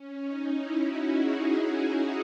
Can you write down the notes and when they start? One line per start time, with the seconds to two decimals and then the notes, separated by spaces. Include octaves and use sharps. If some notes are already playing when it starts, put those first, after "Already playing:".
Already playing: C#4
0.23 D#4
0.52 E4
0.82 F#4
1.12 G#4